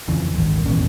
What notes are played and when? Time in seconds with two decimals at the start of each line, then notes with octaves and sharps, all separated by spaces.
0.08 F2 C#3 E3
0.33 G#1 D2
0.64 D#1 G#1 E2 C#4